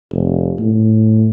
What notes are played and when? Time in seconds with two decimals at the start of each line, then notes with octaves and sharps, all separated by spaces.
0.12 F1
0.59 A2